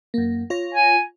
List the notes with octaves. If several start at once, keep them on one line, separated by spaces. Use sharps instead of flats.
F#2 A#3
F4 C#5 A#6
G#5